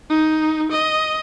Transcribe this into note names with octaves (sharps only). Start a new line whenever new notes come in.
D#4
D#5